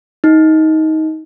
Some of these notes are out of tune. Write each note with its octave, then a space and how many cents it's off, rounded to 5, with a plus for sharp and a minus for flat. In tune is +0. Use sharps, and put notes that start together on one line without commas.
D#4 +20